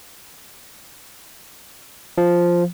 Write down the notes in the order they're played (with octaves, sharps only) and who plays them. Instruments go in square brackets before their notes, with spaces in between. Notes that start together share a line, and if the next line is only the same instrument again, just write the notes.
[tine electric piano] F3